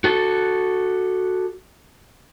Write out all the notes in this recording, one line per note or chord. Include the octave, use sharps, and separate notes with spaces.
F#4 A4